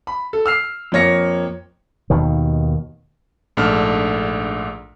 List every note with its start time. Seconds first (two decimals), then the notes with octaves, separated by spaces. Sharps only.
0.07 B5
0.33 A4
0.46 E6 F6 C7
0.92 F2 A#3 C#5 A#6 C#7
2.10 D#2 B2 D#3
3.57 A#1 G#2 A3 D4 A4 F6